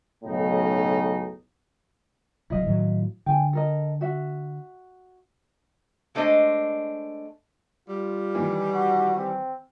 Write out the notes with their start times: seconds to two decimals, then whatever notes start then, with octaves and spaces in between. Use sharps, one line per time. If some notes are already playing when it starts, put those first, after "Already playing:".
0.24 B1 F#2 A2 C#3 D#4
2.50 D1 C3 F#3 E4 D#5 F5
2.67 A2 D#3 F#3
3.26 D3 G5 G#5
3.53 A4 A#4 D#5
4.01 F#4 E5 F#5
6.15 G#3 A3 D4 C5 D#5
7.88 G3 F4
8.35 D#3 E3
8.70 F#4
9.17 C4